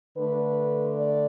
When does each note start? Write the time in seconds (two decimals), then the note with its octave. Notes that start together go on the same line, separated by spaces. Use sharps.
0.17 D3 A3 B4
0.98 D5